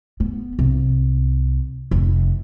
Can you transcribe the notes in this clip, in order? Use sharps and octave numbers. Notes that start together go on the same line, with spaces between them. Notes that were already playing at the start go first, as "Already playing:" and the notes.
B3
C2
F1